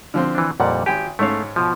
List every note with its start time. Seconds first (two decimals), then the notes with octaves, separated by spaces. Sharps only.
0.14 D3 F3 C4
0.35 E3 D4
0.60 F2 A#2 G3 A#4 D5 F#5
0.86 G#1 G4 G5 G#5
1.19 G#2 A3 C#4 F5
1.56 B2 F3